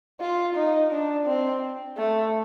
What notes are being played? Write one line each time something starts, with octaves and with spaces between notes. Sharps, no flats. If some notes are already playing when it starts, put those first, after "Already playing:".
F4
D#4
D4
C4
A3